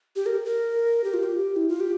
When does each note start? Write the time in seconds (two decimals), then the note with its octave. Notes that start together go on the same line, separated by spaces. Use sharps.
0.16 G4
0.26 A#4
0.45 A#4
1.04 G4
1.14 F4
1.23 G4
1.56 E4
1.69 F4
1.80 G4